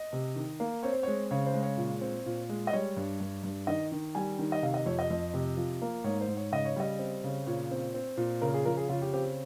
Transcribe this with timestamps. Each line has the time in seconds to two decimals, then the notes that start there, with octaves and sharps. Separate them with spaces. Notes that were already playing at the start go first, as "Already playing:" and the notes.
Already playing: D#5
0.13 C3
0.36 D#3
0.60 A#3
0.83 C4 C#5
0.92 C5
1.03 G#3 C#5
1.31 C#3 C#5
1.46 C5
1.54 G#3
1.63 C#5
1.78 A#2
2.01 C4
2.26 A#2
2.49 G#3
2.67 D#5
2.73 G3 C#5
2.97 G2
3.20 G2
3.43 G2
3.67 D#3 D#5
3.92 D#3
4.15 G3 G#5
4.39 D#3
4.52 D#5
4.62 C3 F5
4.74 D#5
4.86 F2 C#5
4.99 D#5
5.10 F2
5.34 C3
5.57 F3
5.82 A#3
6.04 G#2 C#5
6.21 C5
6.28 G#2
6.37 C#5
6.52 C#3 D#5
6.65 C#5
6.76 G3 D#5
6.99 C4
7.24 C#3
7.46 A#2 C#5
7.71 C4
7.94 C4
8.17 A#2
8.41 C#3 A#4
8.54 G#4
8.65 F3 A#4
8.77 G#4
8.89 C#3 F4
9.02 G4
9.13 C4 G4